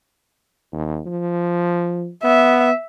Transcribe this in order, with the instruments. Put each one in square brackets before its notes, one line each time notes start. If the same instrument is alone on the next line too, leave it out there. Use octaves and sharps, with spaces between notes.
[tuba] D#2
F3
[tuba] B3 [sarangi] E5